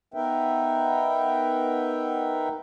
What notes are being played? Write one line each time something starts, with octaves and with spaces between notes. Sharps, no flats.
B3 D#4 A#4 B4 E5 G5